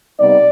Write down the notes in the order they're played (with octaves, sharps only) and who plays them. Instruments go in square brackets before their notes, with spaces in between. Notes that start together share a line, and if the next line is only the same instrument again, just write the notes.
[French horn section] C3 G3 B3 D#4 D5